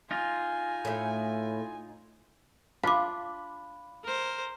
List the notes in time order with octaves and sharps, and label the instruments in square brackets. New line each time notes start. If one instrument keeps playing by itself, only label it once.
[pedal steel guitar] D#4 F4 [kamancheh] G#5
[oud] A2 A3
[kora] D4 F4 [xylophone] F5 D6 [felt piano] B5
[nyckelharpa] A#4 C5